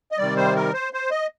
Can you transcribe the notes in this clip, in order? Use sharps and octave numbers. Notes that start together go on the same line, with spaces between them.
D#5
C3 D#3 G3 D5
C5
A#4
C5
C5
D#5